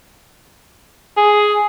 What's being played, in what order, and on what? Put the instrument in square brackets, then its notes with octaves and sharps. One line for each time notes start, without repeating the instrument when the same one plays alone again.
[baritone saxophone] G#4